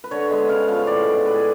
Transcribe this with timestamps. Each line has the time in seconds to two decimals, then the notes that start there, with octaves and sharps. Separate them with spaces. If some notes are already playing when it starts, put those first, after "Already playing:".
0.04 B4
0.11 D3 C#5
0.30 G#3 B3
0.49 C#3 F5
0.68 F3 B3 F5
0.87 A2 D5
1.05 G#3 B3
1.25 A2 B4
1.34 G#4